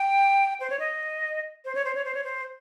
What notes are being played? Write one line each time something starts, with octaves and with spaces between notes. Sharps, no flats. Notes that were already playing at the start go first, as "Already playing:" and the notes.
Already playing: G5
C5
C#5
D#5
C5
C#5
C5
C#5
C5
C#5
C5